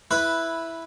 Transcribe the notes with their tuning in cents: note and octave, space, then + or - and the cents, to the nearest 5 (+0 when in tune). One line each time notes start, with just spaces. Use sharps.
E4 +0 B4 -5